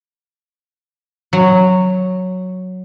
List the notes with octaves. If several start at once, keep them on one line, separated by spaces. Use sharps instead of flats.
F#3